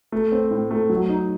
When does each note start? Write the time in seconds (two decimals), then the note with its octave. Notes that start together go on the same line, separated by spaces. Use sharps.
0.12 A3
0.32 C4
0.51 A2
0.71 A3
0.90 F#3
1.09 D#4